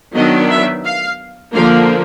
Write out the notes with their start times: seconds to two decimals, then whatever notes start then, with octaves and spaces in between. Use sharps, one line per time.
0.15 D#3 F#3 B3 D4 D#5
0.51 E5
0.85 F5
1.54 D3 F3 A#3 F5